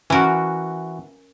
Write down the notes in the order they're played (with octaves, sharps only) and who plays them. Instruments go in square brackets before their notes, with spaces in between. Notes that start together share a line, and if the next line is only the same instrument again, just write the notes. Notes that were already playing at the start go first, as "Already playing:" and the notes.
[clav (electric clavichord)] E3 F#4 [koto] C#4 A#4